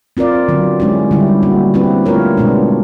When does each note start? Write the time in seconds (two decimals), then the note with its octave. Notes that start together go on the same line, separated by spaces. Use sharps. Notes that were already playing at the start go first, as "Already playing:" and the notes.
0.17 C4 F4 A#4 D5
0.48 D3 F#3 B3
0.80 G#3 C#4 E4 G4
1.11 D3 G3 B3 E4 G4
1.43 G3 A#3 C#4 F#4
1.74 C4 E4 G4 B4
2.06 A3 D4 F4 A#4 C#5
2.37 B2 G#3 B3 D4